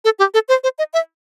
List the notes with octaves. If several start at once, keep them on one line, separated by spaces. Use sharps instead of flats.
A4
G4
A4
C5
C5
D#5
E5